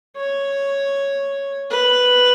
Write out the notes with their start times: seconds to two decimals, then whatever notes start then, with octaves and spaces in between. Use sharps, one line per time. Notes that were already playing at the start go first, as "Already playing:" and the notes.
0.17 C#5
1.70 B4